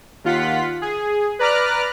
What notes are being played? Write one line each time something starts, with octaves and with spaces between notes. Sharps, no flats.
D#2 F4 F#5 B6
G#4
B4 D5 A#5 D6 F6 F#6